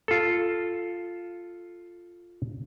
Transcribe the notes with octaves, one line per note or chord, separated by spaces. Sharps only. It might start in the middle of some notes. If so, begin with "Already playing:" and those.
F4 A4